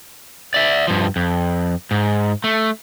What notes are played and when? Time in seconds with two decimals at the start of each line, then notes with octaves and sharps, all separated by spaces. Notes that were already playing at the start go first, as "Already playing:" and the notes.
0.54 D5 E5
0.87 G2 F3
1.16 F2
1.91 G#2
2.44 A3